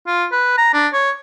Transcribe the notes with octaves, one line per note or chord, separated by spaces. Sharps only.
F4
B4
A#5
D4
C#5